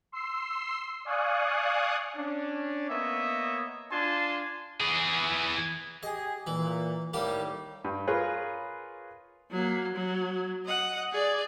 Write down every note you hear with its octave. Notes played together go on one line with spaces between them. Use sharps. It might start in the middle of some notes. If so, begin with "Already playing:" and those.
C6 E6 C7
D5 F5 G#5 C#6 D#6 F#6
C#4 D4
A#3 B3 C#5 D#5 E5
D4 F4 G#5 A5 C6
E3 G#4
G4 G#4 D#5
A#2 E3
A2 D#3 G3 A#3 G4
G2
F4 G#4 A#4 B4 C#5
F#3 A#3
F#3
D#5 F#5
G#4 D5